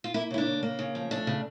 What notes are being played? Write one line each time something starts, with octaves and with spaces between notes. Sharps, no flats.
F4
A#3 E4
C#3 E4
D4
C#3
A#3
C#3
F3
A3 D4
C#3